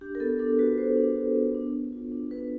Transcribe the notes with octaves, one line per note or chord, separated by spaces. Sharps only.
D4 G4
A#4
B3 A4
D4 A4
F#4 B4
F#4 C5
D4
F#4
B3
D4
D4
F4
D4
D4 B4